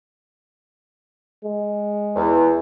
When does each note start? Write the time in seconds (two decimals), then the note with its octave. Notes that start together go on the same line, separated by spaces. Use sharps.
1.45 G#3
2.15 E2